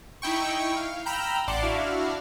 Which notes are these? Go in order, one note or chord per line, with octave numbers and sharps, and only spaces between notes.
D#4 E4 G5 C#6
F5
G5 A#5 B5 E6 F6 G6
A1 D5 F#5 A5 C6 D6
D4 E4 F#4 F5